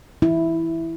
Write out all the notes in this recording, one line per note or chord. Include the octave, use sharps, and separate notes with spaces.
E4